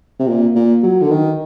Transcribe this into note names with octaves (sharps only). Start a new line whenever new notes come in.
C3
A#2
A#2
F#3
D3
D#3